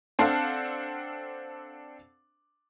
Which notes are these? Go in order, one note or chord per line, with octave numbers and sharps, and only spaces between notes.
C4 D4 A4 C5 F5 F#5